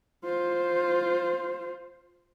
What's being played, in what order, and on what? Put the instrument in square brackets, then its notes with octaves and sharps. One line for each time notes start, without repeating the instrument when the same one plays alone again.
[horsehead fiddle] F4 C5